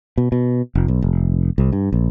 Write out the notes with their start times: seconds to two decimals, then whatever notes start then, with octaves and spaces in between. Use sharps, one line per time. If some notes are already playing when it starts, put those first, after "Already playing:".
0.18 B2
0.32 B2
0.75 F1
0.88 B1
1.02 F1
1.58 C2
1.72 G2
1.92 A#1